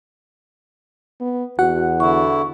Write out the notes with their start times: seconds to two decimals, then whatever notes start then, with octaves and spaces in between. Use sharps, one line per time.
1.20 B3
1.59 E2 F#4 F#5
2.00 D3 E4 C#6